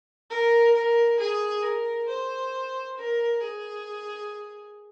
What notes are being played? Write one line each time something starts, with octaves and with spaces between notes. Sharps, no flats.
A#4
A#4
G#4
A#4
C5
A#4
G#4